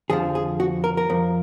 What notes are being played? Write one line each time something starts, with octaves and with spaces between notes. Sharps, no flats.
F2 D3 F3 G#4
G#4
F#4
A#4
A#4
F2 F3